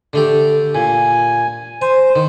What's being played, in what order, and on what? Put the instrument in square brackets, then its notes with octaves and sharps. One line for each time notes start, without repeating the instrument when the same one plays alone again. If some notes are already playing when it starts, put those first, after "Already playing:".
[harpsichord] D3 A3 G4
[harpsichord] A#2 [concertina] G#5
[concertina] C5 [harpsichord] G#5
[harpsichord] D#3